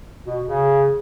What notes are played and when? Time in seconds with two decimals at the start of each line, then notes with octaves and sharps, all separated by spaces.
0.26 B2
0.44 C#3